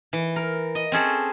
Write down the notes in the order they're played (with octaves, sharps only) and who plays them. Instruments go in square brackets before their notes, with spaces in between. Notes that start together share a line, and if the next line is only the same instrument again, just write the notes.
[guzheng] E3
A#4
D#5
C4 C#4 G#4 A4